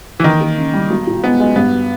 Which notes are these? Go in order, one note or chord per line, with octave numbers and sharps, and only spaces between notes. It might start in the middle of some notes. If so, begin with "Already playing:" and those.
E3
D#3 A#3
A#3
C#3
G3
B1
A#2
G#3 B3
G#3
G2 B3